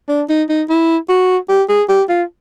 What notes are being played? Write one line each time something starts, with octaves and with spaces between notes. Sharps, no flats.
D4
D#4
D#4
E4
F#4
G4
G#4
G4
F4